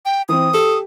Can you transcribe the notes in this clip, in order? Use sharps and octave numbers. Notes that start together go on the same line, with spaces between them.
G5
E3 C4 D#6
G4 A4